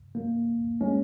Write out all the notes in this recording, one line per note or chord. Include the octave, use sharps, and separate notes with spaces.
A#3
G#3 C#4